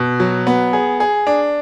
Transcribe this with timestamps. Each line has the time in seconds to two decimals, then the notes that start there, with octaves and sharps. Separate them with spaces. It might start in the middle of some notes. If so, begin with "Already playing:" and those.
Already playing: B2
0.20 F#3
0.47 B3
0.73 G#4
1.00 G#4
1.27 D4